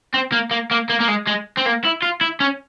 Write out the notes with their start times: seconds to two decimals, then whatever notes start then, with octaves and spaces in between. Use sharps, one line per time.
0.14 C4
0.32 A#3
0.51 A#3
0.71 A#3
0.89 A#3
1.00 A#3
1.08 G#3
1.27 G#3
1.57 C4
1.66 A#3
1.84 E4
2.02 F4
2.21 E4
2.40 C#4